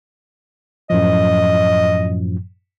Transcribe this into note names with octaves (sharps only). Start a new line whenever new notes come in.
F#2 A2 F3 D#5